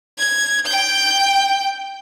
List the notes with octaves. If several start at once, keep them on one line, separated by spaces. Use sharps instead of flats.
G#6
G5 G6